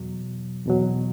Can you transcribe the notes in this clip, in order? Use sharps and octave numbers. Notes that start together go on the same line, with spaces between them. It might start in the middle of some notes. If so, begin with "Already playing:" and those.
Already playing: E2 B2 F#3
E2 B2 F#3